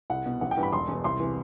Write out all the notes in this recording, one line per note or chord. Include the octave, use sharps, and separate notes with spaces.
C2 F#5
B2
A1 F#5
G5
G2 E3
B5
E1 C6
E2 B2
C2 C6
C3 E3